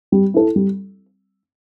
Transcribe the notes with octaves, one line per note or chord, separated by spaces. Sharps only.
G3
E4 A4
G3